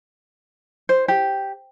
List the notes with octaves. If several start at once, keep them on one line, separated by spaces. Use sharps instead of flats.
C5
G4